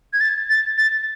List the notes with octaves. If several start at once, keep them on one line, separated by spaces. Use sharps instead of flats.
G#6
A6
A6
A6